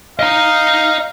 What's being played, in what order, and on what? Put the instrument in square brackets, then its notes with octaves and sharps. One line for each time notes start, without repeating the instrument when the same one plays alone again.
[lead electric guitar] D#5 A#5 [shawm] F5